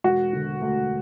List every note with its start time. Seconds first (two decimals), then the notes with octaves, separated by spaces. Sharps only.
0.04 E1 F#4
0.33 D3
0.61 D2